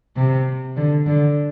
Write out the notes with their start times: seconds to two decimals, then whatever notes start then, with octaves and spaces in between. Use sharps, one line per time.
0.17 C3
0.77 D3
1.07 D3